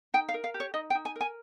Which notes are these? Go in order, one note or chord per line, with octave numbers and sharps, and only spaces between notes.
D#4 G5
F5
A#4
F5
G4
C#5
D#4 D#5
G5
D#4
G#5
A#4 G#5